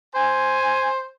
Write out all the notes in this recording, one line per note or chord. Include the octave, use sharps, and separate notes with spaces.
C5 G#5